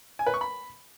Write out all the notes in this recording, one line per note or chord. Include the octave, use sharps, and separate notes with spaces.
G#5
B4
C#6
B5